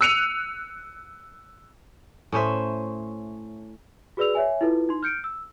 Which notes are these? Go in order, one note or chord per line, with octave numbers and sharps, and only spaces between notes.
E6 F#6 C#7 D#7 F7
A2 C#4 C5 E5
F#4 G#4 B4 D5 E6 F7
C#5 E5 G#5
E4 F4 A4 B4
D#4 C6
F6 G6 C#7 D7
E6